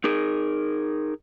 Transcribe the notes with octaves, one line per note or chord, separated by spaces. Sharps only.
D#4 G#4 A#4